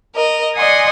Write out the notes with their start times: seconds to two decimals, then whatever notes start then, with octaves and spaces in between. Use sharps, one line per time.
0.15 A#4 D#5
0.55 D5 D#5 F#5 G#5 C6 D#6